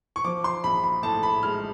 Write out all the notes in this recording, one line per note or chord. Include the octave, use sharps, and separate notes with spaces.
C#6
F3 D6
C6
A#1 B5
B5
A2 A5
B5
G#3 F6